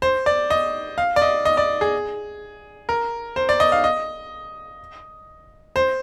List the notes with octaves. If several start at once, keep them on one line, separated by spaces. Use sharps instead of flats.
C5
D5
D#5
F5
D5
D#5
D#5
D5
G#4
A#4
C5
D5
D#5
F5
D#5
C5